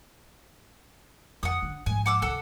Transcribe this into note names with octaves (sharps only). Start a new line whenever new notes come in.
F2 F#5 D#6
D3
G#2 F3 G#5
F#5 D6 E6
C2 A4 F#5 E6